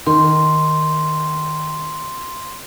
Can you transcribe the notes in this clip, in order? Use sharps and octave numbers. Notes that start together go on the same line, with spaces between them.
D#3 C6